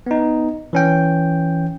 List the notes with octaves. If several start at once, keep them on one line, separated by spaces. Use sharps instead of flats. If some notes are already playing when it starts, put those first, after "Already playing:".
B3 D#4
E3 C#4 G5